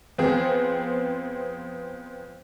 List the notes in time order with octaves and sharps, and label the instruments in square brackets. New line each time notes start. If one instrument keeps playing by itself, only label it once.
[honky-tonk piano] F2 B3 C4 G#4